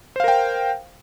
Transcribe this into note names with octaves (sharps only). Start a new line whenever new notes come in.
A#4 C5 F5 G5